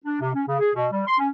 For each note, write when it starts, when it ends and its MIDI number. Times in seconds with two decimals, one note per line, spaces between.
0.05 0.18 62
0.20 0.32 48
0.34 0.42 61
0.47 0.58 49
0.60 0.71 68
0.75 0.87 47
0.92 1.02 55
1.07 1.15 84
1.19 1.28 61